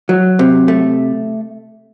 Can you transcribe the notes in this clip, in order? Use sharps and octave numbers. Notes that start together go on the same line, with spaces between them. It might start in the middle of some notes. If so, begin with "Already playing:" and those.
F#3
C3
A3